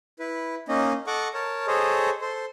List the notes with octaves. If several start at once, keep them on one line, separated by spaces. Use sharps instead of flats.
E4 B4
A#3 C#4 D#4 D#5
A4 D#5 F#5 C#6 D6
A#4 C#5 A5
G#4 A4 C5 C#5 D#5
A4 C5 C6